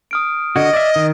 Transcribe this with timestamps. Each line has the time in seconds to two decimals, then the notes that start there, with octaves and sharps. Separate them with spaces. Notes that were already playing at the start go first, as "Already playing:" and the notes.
0.11 D#6 F6 D7
0.56 D3 F#4 D#5 G#6
0.73 D5 E5
0.96 D#3